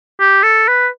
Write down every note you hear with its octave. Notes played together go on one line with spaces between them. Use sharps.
G4
A4
B4